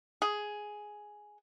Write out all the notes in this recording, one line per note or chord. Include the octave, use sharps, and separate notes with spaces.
G#4